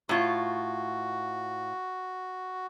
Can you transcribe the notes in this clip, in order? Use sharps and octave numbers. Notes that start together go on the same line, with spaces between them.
A2 F4 F#4